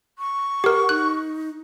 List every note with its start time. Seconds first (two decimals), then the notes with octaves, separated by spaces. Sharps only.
0.18 C#6
0.64 G4 A#4 F#5
0.89 D#4 F#6